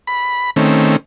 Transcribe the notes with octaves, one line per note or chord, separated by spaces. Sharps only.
B5
D#3 A3 C4 C#4